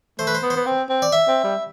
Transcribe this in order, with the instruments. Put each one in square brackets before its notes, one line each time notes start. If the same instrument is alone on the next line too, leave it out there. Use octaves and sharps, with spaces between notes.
[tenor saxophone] A3 [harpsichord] C5
[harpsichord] B4
C5
[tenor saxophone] B3
[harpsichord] C5
[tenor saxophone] B3
C4
C4
[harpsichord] D5
E5
[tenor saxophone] C4
G3